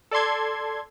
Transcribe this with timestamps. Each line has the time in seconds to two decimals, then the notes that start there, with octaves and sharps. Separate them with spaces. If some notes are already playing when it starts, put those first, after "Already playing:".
0.11 A4 D5 A5 C6 G#6